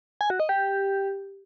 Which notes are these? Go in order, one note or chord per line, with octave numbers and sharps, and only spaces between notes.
G#5
F#4
D#5
G4